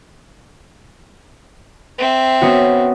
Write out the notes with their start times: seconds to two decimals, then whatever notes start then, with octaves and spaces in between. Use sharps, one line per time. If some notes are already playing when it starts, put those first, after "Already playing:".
1.98 C4 E5
2.41 B3 C#4 F#4